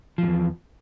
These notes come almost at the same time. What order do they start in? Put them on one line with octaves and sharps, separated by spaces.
F3 G2 E2